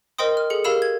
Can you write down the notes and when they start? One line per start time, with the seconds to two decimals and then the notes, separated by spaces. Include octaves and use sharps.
0.18 A#4 C5 D#5 G5 C6 D#6
0.37 F6
0.50 G#4 A4 C#7
0.64 G4 A#4 F5 B5 E6 E7
0.82 G#6